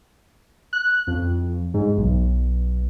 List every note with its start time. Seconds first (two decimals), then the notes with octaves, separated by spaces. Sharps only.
0.73 F#6
1.07 F2
1.74 G#2
1.97 B1